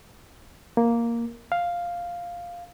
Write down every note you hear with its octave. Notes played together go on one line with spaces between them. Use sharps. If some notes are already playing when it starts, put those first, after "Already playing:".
A#3
F5